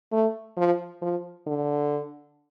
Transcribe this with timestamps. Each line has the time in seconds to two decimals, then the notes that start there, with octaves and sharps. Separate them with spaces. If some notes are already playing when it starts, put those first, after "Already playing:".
0.12 A3
0.57 F3
1.02 F3
1.46 D3